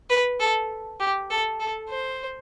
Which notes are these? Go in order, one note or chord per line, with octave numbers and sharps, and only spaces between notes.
B4
A4
G4
A4
A4
C5